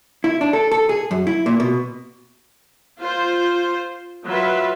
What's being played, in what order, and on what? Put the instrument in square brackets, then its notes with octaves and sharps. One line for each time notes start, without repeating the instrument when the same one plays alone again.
[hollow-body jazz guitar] E4
D4
A4
A4
G#4
F#2
E4
A#2
B2
[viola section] F4 C5
F#3 F4 B4 E5